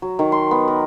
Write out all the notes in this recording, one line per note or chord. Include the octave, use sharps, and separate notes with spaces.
F#3
D#3
C6
B3
A#4